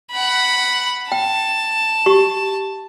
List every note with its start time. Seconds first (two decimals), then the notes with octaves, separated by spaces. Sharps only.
0.12 F#5 B5
1.12 G5 A5
2.06 G4 C#6